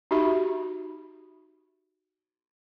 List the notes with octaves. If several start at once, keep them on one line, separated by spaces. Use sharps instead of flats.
D#4 F#4 G4 E5 B5